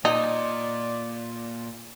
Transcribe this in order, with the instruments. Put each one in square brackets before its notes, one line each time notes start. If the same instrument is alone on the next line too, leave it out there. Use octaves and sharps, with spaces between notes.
[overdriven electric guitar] A#2 [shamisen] D#4 [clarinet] D5